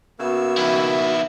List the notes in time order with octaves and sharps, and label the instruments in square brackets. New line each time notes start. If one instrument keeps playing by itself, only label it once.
[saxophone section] C#3 A#3 E5 [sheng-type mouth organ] B3 E6 [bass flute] F#4
[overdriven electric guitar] D#3 E4